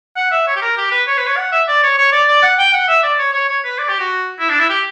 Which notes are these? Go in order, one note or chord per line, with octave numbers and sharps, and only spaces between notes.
F#5
E5
C#5
G4
A#4
G4
B4
C#5
B4
C#5
F#5
E5
D5
C#5
C#5
D5
D5
F#5
G5
F#5
E5
D5
C#5
C#5
C#5
B4
D5
G4
F#4
E4
D4
E4
G4